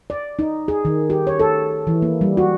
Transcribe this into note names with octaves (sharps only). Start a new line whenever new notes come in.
D5
D#4
G#4
D#3
G4
C#5
A4
E3
A#3
G3
F#4